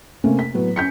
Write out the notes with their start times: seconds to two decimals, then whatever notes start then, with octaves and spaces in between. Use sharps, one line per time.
0.24 C3 A3 A#3 C#4
0.39 B6
0.54 A2 F#3 B3
0.76 C#4 G6 B6 C#7